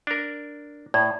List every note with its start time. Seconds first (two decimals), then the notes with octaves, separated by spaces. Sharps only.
0.07 D4 A#4
0.94 A2 D5